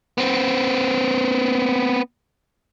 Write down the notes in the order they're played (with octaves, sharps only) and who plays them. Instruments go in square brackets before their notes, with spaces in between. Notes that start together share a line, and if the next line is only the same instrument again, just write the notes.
[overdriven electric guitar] B3 C4